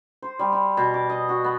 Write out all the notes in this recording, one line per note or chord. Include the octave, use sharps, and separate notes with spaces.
C5
G3
B5
B2
D6
D#5
F#4
B3